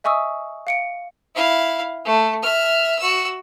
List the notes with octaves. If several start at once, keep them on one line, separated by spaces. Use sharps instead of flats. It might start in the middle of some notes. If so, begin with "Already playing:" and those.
D#5 E5 G#5 C#6 D#6 E6
F5 C#7 D7
E4 F5
A3
E5 F6
F#4 E6